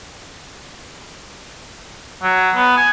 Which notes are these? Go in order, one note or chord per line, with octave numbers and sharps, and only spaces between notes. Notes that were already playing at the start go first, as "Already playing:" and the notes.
F#3
B3
G#5